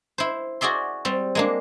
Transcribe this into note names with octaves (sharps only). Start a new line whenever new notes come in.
E4 C5
F#4 G#4 D5 E5 C6
G3 C4
G#3 A#3 D4